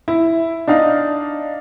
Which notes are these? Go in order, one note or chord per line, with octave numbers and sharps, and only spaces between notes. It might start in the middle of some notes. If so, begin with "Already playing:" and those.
E4
D4 D#4 F5